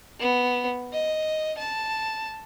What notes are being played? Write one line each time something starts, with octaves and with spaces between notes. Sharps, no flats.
B3
D#5
A5